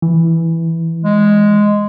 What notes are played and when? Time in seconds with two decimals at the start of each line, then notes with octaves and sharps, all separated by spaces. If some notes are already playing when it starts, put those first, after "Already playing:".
0.02 E3
1.04 G#3